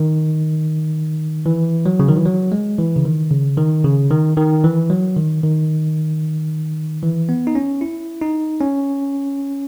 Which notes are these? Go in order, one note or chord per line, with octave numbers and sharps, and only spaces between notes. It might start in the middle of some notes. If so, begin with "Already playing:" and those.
Already playing: D#3
E3
F#3
C#3
D#3
E3
F#3
G#3
E3
C#3
D#3
C#3
D#3
C#3
D#3
D#3
E3
F#3
D#3
D#3
E3
B3
D#4
C#4
E4
D#4
C#4